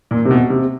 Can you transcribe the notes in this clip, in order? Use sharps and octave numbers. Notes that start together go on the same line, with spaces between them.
A#2
C3
B2
C3